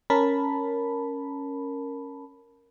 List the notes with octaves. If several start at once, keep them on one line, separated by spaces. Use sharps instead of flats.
C#4 A#4 A5 B5